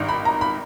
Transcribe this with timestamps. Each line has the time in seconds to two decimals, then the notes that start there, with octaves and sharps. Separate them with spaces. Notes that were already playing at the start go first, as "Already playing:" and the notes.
Already playing: G#1 G2 D#3
0.09 B5
0.25 A#5
0.41 B5